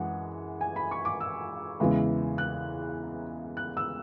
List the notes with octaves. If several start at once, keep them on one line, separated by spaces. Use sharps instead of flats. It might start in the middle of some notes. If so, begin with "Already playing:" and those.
Already playing: F#2 E3 G#3 F#5
G#5
B5
C#6
D6
E6
E2 C#3 E3 G#3
F#6
F#6
E6